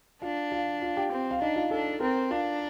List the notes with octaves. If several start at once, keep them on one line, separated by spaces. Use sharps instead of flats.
D4 F4 F5
F4 F5
F4 F5
G4 G5
C4
F5
D4 D#4 D#5
F4 F5
D4 A4
C4 A#4
D4 F4 F5